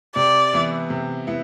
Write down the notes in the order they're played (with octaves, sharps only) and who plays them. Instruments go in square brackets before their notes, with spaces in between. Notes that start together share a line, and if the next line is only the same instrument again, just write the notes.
[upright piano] C3 [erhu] D5
[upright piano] E3 B3 E4
C3
B3 E4